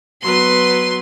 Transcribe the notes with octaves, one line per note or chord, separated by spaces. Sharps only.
F#3 B3 B4 C6